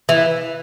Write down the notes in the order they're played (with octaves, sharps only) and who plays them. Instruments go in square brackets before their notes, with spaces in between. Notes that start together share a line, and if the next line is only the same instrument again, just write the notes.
[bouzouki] E3